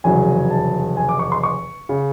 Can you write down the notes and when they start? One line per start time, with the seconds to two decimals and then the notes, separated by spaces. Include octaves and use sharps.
0.04 F1 E2 C#3 F#3 G#5
0.50 A5
0.97 G#5
1.09 D6
1.19 C#6
1.32 C6
1.43 C#6
1.89 C#3